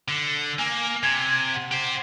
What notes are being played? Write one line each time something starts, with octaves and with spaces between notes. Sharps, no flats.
D3
A#3 G#5
C3 G#6
F#5
G4 C5